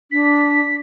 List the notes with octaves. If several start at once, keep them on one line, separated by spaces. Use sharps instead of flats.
D4 B6